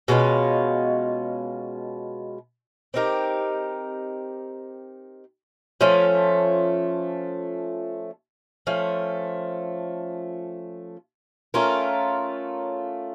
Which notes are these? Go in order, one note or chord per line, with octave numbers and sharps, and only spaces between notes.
B2 G#3 C#4 F4
C4 D#4 G4 A#4
F3 A3 C#4
F3 A3 C#4
A3 C#4 F4 A#4